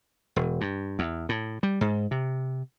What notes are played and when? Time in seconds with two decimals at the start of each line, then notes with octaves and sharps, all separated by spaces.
0.36 E1
0.61 G2
0.99 E2
1.29 A2
1.63 G3
1.81 G#2
2.11 C3